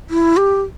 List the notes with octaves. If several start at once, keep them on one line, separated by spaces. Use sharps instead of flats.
E4
G4